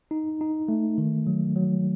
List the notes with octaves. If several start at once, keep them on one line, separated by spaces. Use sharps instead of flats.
D#4
D#4
A3
D#3
F#3
F#3